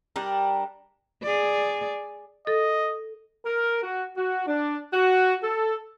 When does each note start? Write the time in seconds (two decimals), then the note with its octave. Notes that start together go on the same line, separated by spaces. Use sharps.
0.16 G3 D4 A#4
1.23 G#4 D5
2.47 A4 D#5
3.46 A#4
3.83 F#4
4.17 F#4
4.47 D4
4.94 F#4
5.43 A4